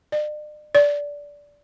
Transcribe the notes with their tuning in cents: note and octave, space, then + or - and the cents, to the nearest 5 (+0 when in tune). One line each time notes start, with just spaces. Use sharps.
D5 +40
D5 -15